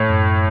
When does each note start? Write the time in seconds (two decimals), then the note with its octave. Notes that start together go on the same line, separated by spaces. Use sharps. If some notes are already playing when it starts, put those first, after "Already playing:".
Already playing: A2
0.10 F#2